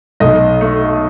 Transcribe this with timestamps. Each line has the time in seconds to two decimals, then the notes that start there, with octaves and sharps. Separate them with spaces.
0.20 B1 D#5
0.61 A3